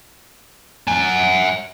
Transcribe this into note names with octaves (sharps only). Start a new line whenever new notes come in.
F#5 G#5